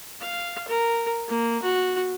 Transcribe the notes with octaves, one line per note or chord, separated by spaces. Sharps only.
F5
A#4
A#3
F#4